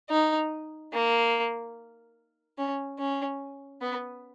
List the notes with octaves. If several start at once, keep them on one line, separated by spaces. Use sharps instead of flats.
D#4
A#3
C#4
C#4
B3